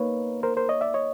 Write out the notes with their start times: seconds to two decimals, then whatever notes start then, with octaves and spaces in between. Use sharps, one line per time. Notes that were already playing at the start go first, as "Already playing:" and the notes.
Already playing: A#3 D#4 B4 C#5
0.43 A#4 C5
0.57 A#4 C5
0.69 C#5 D#5
0.81 D5 E5
0.94 C#5 D#5